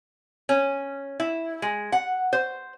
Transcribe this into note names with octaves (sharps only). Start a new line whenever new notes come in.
C#4
E4
G#3
F#5
C5